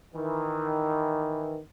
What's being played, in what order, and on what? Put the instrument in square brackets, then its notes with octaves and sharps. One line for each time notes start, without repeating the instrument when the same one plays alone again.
[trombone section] D#3 E3